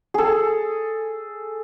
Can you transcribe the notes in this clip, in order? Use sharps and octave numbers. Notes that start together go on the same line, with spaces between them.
G#4 A4